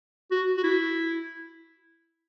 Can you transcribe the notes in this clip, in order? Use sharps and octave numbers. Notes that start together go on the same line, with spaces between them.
F#4
F#4
E4